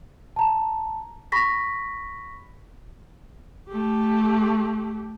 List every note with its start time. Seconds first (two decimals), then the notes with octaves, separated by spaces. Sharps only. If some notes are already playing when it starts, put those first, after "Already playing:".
0.36 A5 A#5
1.32 B5 C#6 A#6 B6
3.70 A3 G4